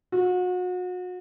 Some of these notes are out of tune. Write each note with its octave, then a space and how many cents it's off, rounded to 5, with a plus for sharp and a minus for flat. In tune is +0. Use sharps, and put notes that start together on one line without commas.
F#4 -35